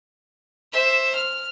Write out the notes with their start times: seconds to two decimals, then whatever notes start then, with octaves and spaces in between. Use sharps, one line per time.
0.73 C5 E5
1.16 F6